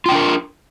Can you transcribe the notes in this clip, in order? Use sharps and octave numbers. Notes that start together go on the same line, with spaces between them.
D4 F4 A#4 G5